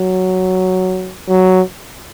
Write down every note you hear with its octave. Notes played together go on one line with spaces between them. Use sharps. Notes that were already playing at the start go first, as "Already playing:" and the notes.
Already playing: F#3
F#3